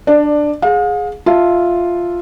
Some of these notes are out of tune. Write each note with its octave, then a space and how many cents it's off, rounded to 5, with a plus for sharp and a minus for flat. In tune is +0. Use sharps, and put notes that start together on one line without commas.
D4 +10 D5 +20
G#4 +0 F5 +45
F4 +0 E5 +0 A5 +0